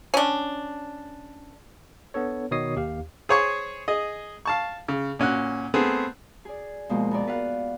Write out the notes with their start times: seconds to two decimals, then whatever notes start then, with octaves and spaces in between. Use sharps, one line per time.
0.14 C#4 D4
2.14 B3 D4 A4 C#5
2.51 B2 D#3 C#5 D#5 D#6 C7
2.76 D#2 G4 F5
3.29 G#4 C5 C#5 G#5 C#6
3.88 G#4 D#5
4.45 F5 A5 C#6
4.88 C#3
5.19 A#2 C#4 F#4 F#6
5.74 A3 B3 C4 G#4
6.45 G#4 D5
6.89 B2 F3 G#3 A#3
7.11 B3 A#4 D5
7.27 B4 F5 F#5